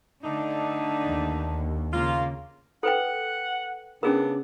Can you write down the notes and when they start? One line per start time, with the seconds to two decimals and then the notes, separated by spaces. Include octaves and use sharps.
0.24 D3 A3 D4 D#4
1.05 D#2
1.93 C#3 A#3 F4
2.83 A4 B4 F#5 G5
4.03 C#3 B3 C#4 D4 G#4 A#4